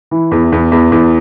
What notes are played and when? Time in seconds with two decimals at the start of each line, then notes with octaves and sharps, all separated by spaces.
0.11 E3
0.31 E2
0.52 E2
0.72 E2
0.92 E2